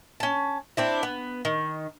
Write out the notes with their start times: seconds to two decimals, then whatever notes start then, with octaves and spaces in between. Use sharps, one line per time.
0.20 C#4 A5
0.77 C4 D4 E4
1.03 B3
1.45 D#3